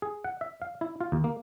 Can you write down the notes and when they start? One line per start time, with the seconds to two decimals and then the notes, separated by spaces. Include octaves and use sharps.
0.02 G#4
0.24 F#5
0.41 E5
0.62 F5
0.81 E4
1.01 F4
1.12 D#2
1.24 A#3